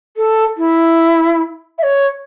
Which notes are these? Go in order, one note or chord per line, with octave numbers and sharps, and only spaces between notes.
A4
E4
E5
C#5